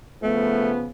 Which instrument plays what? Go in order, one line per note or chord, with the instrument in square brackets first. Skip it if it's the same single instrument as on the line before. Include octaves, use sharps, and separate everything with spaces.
[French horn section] C#3 F3 B3 [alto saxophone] A3